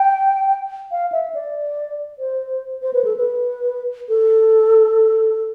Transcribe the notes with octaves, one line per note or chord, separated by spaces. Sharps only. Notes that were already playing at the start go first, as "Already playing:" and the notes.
Already playing: G5
F5
E5
D5
C5
C5
B4
A4
B4
A4